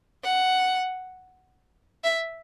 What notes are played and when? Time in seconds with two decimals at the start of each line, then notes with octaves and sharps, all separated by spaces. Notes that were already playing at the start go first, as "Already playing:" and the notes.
0.24 F#5
2.04 E5